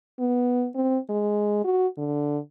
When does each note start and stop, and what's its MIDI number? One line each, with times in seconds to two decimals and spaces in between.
0.19 0.67 59
0.75 0.98 60
1.09 1.64 56
1.64 1.87 66
1.98 2.38 50